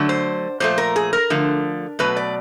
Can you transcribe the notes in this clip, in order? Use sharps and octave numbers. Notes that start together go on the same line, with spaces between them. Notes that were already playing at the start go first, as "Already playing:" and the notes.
Already playing: D3 F#3 A3
C5
A#2 F3 A3 C5
A#4
G#4
A#4
D3 F3 A3
B2 F#3 A3 B4
D5